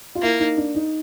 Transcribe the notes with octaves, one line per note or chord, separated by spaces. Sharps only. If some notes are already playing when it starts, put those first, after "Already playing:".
F4
A#3 E4
D#4
D4
D#4